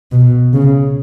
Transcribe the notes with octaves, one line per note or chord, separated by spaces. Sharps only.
B2
C#3